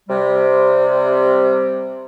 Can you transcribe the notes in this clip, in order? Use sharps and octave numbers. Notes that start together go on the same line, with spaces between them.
C3 G3